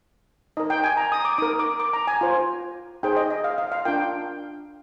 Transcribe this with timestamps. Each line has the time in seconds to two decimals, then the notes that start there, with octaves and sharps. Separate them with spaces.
0.57 D#4 A#4 D#5
0.70 G5
0.84 G#5
0.97 A#5
1.12 D#6
1.25 D6
1.38 D#4 A#4 D#6
1.59 D6
1.80 D6
1.93 A#5
2.07 G#5
2.21 F4 C5
3.03 D#4 G#4 C5 G5
3.17 D#5
3.30 D#5
3.44 F5
3.58 F5
3.72 F5
3.85 D4 F4 A#4 G5